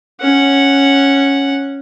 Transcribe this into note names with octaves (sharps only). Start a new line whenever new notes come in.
C#4 F#5